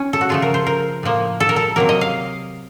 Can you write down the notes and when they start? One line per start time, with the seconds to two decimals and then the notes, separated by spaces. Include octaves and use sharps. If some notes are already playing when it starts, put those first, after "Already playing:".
Already playing: C#4
0.13 A4
0.21 F#4
0.29 C#3 F3 A3 F4
0.42 A#4
0.54 C5
0.67 A#4
1.03 A2 F3 A#3
1.40 A4
1.49 A#4
1.56 A4
1.76 C3 F#3 A#3 A#4
1.89 D#5
2.01 F5